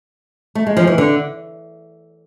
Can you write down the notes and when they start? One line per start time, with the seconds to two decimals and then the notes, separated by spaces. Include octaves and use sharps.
0.55 A3
0.67 G#3
0.77 F3
0.87 E3
0.98 D3